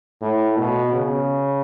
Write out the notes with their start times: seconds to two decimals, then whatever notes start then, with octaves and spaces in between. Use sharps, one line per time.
0.21 A2
0.57 B2
0.93 C#3